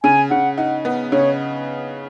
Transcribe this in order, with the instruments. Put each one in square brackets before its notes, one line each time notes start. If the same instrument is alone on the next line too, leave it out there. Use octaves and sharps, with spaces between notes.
[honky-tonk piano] C#3 [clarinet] G#5
[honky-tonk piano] C#3 [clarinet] F#5
[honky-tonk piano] D#4 [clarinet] F#5
[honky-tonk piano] B3
[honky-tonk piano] C#3 [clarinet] C#5